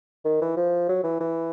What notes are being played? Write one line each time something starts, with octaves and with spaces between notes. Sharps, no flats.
D#3
E3
F3
F#3
E3
E3